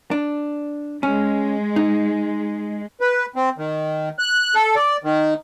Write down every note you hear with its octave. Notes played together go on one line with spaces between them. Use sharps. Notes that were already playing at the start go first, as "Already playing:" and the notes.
D4
G#3 C#4
D#4
B4
C4
D#3
F#6
A4
D5
D#3